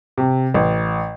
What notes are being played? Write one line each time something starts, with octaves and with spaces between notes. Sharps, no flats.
C3
A1